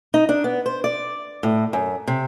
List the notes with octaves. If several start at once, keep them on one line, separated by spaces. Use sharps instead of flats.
D#4
D4
B3
C5
D5
A2
F#2
C3